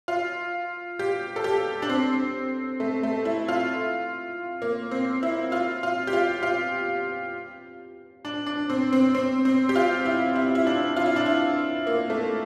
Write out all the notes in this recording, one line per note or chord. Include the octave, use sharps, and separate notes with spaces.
F4
G4
A4
G4
D4
C4
A3
A3
E4
F4
A#3
C4
E4
F4
F4
G4
F4
F4
D4
D4
C4
C4
C4
C4
G4
F4
E4
E4
E4
D4
F4
E4
D4
E4
A#3
A3